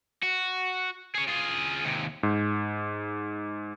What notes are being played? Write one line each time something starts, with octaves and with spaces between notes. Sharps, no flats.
F#4
G#4 C#5
F4 G#4
D#2 C3
G#2